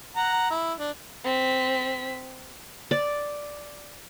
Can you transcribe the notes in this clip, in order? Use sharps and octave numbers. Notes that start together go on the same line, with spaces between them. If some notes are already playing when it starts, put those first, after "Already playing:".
F#5 A#5
E4
D4
C4 B6
D5